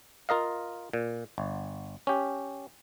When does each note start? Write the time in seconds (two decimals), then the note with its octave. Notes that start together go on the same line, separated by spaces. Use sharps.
0.29 F4 A#4 D#5 F5
0.93 A#2
1.38 G1
2.07 C#4 G4